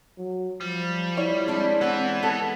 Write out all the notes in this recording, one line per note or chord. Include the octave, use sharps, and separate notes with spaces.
F#3
F3 G3
E4 C#5 D5
G#3 C4 D4 E4
E3 B3 C4
B3 A4